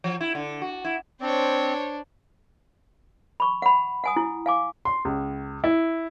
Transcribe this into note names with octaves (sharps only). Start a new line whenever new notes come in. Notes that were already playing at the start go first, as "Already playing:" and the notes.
F3
E4
D3
F#4
E4
C4 D4 C5 C#5
B5 C#6
F#5 B5
F#5 G#5 D#6
E4
F5 G#5 D6
C6
C#2
E4